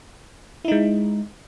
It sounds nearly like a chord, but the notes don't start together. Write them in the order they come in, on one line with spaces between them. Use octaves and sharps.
E4 D#4 G#3